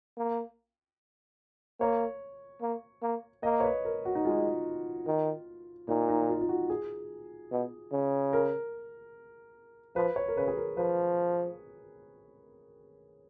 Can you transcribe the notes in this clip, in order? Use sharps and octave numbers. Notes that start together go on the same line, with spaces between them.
A#3
A#3 C#5
A#3
A#3
A#3 D#5
C#5
B4
A#4
F#4
D#4
G#3 F4
D#3
A#2 D#4
D#4
F4
F4
F#4
G#4
B2
C#3
A#4
F3 B4
C#5
A#4
C#3 B4
G#4
A#4
F3 B4